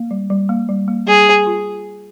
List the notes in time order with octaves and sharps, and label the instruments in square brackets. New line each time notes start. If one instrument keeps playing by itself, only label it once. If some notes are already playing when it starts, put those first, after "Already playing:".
Already playing: [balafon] A#3
G3
G3
A#3
G3
A#3
[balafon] G3 [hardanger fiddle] G#4
[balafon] G3
F4